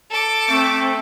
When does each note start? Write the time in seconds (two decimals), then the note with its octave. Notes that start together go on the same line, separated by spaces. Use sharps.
0.11 A4 D6
0.49 A3 C4